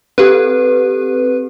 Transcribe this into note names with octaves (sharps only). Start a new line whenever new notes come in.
C4 G4 A4 B4